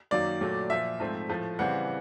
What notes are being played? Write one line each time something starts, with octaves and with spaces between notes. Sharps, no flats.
F#2 D#3 F#3 A#3 D5
A#2 F#3 A3
A#2 F3 A#3 E5
G#2 F3 A3 C4
A2 F3 A3
C#3 E3 G3 C4 F#5